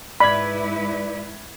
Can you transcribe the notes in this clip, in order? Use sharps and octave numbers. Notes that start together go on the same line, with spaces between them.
G#2 E4 B4 D5 B5 G#6